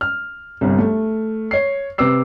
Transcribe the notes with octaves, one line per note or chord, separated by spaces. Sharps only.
F6
G1 C2
A3
C#5 C7
C3 B4 D6 E6 C7